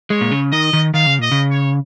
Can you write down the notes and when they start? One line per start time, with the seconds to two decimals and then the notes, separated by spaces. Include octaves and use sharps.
0.10 G#3 C#5
0.21 A#2
0.31 C#3
0.52 D#3 D#5
0.73 D#3
0.94 D#3 F5
1.06 C#3
1.19 A#2 D#5
1.31 C#3
1.51 C#5